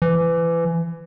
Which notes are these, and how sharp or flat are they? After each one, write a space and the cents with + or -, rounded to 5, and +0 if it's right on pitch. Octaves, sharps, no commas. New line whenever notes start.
E3 +25